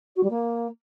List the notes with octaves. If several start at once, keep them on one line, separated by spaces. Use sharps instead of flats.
F#4
G3
A#3